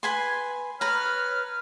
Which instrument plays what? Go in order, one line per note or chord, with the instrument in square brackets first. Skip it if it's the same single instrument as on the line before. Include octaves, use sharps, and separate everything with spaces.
[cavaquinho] B4 G#5 C6
[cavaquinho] B4 A#5 [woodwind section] C#5 F6